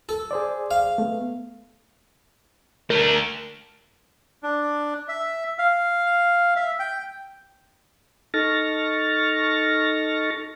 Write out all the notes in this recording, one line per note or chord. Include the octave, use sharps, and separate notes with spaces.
A4
G#4 C5 D5
F5
A3 B3
A3 D4 A#4
D4
E5
F5
E5
G5
D#4 A4 C#6 F6 A6 A#6